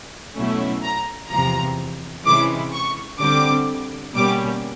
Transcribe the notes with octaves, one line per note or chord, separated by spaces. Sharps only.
B2 F#3 A3 C#4 E4
A#5
E2 C3 F3 A#5
C3 E3 G#3 C#4 E4 D6
C#6
D3 G3 C4 D6
B2 G3 A#3 C#4 D6